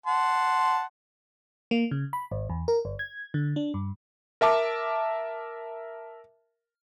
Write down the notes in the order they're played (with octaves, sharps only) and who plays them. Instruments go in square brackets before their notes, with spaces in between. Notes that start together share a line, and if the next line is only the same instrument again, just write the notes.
[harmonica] F#5 A5 C6
[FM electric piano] A#3
C#3
B5
G#1
E2
A#4
G1
G#6
D3
D4
G2
[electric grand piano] A#4 E5 A5 D6